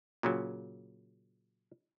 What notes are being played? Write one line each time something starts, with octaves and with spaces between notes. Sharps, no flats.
A#2 C#3 F#3